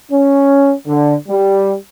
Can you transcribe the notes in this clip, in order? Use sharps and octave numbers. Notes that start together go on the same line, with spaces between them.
C#4
D3
G3